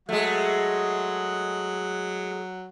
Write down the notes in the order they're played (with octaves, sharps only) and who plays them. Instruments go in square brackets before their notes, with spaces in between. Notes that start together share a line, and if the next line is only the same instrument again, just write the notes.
[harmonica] F#3 F#5 [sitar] G#3 A3